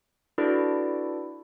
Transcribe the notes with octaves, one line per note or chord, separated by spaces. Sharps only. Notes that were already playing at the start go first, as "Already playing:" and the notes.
D4 E4 F#4 A4 B4 D5